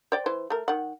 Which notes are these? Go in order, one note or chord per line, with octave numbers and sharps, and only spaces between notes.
C5 D5 G5
E3 C5
A3 A#4
D#3 F#5